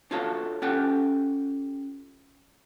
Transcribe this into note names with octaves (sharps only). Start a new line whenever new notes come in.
D4 F4 F#4 A4 C#5 F5
C#4 F4 G4 A4 F#5